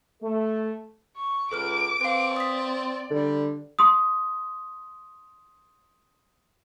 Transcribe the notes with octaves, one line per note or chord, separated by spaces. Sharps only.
A3
C#6
C#2 A4 B4 D6 F6
C4 B4 F5
D5 D#6 B6
D3 G3
C6 D#6